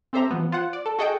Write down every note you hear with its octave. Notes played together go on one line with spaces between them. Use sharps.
C4 G4 A4 C5 E5 A#5
E3 F3 B3
F4 C5 F#5
D5
A4
F#4 G#4 A4 D#5 F#5 G5